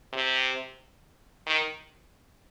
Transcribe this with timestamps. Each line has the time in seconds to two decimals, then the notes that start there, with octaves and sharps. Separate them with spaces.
0.13 C3
1.47 D#3